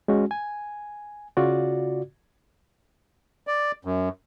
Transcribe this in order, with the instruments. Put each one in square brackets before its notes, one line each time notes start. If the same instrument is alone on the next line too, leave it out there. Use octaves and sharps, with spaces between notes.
[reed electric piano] G#3 C#4 F#4
G#5
C#3 F4 F#4 D5
[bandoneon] D5
F#2